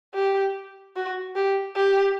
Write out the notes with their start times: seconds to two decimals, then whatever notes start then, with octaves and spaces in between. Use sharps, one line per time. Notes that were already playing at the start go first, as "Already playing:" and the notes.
0.14 G4
0.96 F#4
1.35 G4
1.76 G4